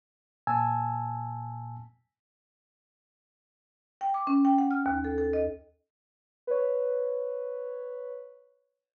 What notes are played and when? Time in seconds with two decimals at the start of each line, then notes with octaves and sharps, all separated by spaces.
0.47 A#2 G#5 A5 E6
4.01 G5
4.14 D6
4.27 C#4
4.45 G5
4.58 F#5
4.71 F6
4.86 D#2
5.04 A4
5.18 A4
5.33 D#5
6.47 B4 C#5